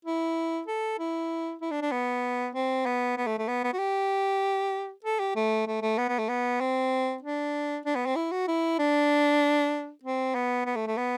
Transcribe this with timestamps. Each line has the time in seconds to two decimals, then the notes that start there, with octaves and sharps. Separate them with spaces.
0.05 E4
0.67 A4
0.99 E4
1.62 E4
1.71 D4
1.82 D4
1.92 B3
2.55 C4
2.86 B3
3.18 B3
3.27 A3
3.38 A3
3.48 B3
3.64 B3
3.73 F#4
3.79 G4
5.04 A4
5.20 G4
5.36 A3
5.67 A3
5.82 A3
5.98 B3
6.09 B3
6.19 A3
6.29 B3
6.61 C4
7.22 D4
7.85 D4
7.96 B3
8.06 C4
8.16 E4
8.32 F#4
8.48 E4
8.79 D4
10.04 C4
10.35 B3
10.66 B3
10.76 A3
10.87 A3
10.97 B3